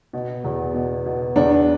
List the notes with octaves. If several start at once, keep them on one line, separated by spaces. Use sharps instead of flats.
B2
E2
B2
B2
E2 D4